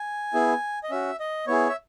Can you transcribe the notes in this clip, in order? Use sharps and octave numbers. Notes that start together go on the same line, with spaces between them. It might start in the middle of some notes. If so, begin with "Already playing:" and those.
Already playing: G#5
B3 E4 G#4
D#5
C#4 F#4 E5
D#5
B3 E4 G#4 C#5
E5